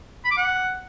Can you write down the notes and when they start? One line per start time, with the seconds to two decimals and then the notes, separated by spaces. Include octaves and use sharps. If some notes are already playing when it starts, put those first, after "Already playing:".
0.25 B5
0.31 D6
0.37 F#5